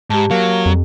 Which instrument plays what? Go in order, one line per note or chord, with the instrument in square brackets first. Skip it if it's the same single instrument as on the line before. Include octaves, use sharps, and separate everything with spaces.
[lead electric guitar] G#2 [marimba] G4 A5
[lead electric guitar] F#3 [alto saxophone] A#3
[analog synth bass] F2